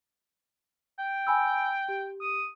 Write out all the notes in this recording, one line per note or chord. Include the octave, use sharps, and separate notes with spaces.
G5
G#5 B5 E6
G4
D#6